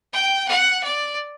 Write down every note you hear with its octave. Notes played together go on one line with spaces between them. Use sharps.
G5
F#5
D5